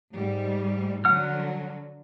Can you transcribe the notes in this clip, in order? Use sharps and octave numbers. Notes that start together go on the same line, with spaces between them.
G#2 G3
D3 F#3 F#5 F6